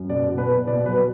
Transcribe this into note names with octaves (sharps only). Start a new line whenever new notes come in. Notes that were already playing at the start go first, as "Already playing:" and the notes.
Already playing: F#2
B2 D5
B2
B4
B2
B2 D5
F#3 B4